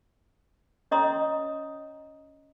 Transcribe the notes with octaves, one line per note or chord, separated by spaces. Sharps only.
C#4 C#5 D#5 A#5 C6 D#6